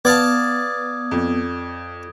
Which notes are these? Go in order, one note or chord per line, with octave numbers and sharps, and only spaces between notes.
B3 D5 F5 A5 D#6 G#6
F2